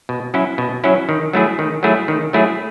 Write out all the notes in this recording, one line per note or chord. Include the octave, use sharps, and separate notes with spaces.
B2
F#3 C#4 E4
B2
F#3 C#4 E4
D#3
F#3 A3 E4 G#4
D#3
F#3 A3 E4 G#4
D#3
F#3 A3 E4 G#4